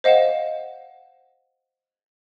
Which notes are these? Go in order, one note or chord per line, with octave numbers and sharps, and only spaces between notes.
C5 D#5 F5 F#5 E7